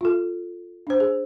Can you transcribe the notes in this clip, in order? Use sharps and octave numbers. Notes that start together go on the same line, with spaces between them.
F4 A4
D4 C5
G#4